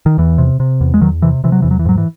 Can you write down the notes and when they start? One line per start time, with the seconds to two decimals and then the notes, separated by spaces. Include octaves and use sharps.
0.06 D#3
0.18 E2 E3
0.38 C3
0.60 C3
0.81 E2
0.94 G#3
1.01 E2 D#3 F#3
1.22 C3 E3
1.44 C3 E3
1.52 F#3
1.62 E2 E3
1.71 F#3
1.79 E3
1.85 G#2 F#3
1.98 E3